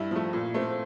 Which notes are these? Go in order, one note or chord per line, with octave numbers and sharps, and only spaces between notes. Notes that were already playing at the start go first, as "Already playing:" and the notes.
Already playing: G2 E4
F3 A3
A#2
A3 C4